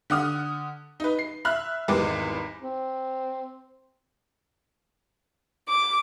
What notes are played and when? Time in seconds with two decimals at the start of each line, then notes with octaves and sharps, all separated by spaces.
0.10 D3 F#5 D#6 F6
1.00 D#4 B4
1.19 C7
1.45 E5 B5 F6 F#6
1.88 G#1 E2 G3 G#3 B4 D6
2.62 C4
5.68 D6